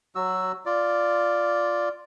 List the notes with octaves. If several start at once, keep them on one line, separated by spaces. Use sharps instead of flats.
F#3 F#4 E6
F4 D5